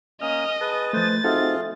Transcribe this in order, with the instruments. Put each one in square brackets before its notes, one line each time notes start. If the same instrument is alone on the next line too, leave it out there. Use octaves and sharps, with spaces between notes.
[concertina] A#3 C#4 [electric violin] D#5 [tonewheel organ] D#6 F6
[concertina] G#4 B4 [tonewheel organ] A5 D#6
[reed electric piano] F3 A3 [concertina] B4 C5 [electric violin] A6
[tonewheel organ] C4 D#4 F#4 [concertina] F4 G#4 F5 [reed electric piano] A4 E5